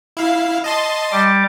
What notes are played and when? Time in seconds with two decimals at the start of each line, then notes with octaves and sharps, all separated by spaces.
0.17 E4 F5
0.64 D#5 A5 C6
1.12 G3 D6